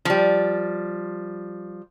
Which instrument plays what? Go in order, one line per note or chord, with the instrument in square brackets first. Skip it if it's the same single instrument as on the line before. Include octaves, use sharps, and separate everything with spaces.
[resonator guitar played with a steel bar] F3 G3